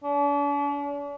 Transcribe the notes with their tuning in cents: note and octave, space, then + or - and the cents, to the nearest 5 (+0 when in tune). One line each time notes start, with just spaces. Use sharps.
D4 -45